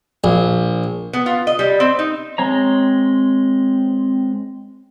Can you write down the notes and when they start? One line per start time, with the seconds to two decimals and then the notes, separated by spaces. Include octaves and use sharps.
0.24 A#1
1.13 B3
1.26 F4
1.47 D#5
1.59 G3
1.80 C4
1.99 D#4
2.38 G#3 C4 C#5 A#5